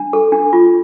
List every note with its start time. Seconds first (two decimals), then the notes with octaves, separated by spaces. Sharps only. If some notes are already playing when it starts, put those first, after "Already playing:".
Already playing: D4
0.13 A4
0.32 D4
0.53 F4